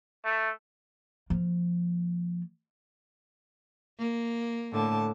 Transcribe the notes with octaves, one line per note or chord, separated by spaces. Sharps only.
A3
F3 A#3
A#3
A2 D3 A5